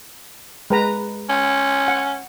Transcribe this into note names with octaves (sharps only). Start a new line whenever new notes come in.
G#3 B4 A#5
C#4
F#5